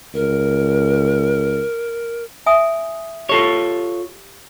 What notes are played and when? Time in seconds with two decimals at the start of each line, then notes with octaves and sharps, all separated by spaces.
0.14 C#2 A#4
2.46 E5 G#5 D#6
3.29 F4 G4 A4 C#5